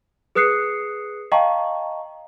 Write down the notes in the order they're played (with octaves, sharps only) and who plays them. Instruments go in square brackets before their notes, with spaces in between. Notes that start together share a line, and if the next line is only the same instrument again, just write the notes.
[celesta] G#4 B4 D#6 F#6 C7 C#7
D#5 F5 G5 A5 A#5 C#6